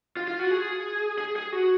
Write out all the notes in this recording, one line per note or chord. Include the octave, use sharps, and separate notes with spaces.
F4
F4
F#4
G#4
G#4
G#4
F#4